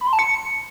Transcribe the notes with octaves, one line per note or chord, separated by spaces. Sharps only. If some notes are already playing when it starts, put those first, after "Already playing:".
B5
C6
A5
C#7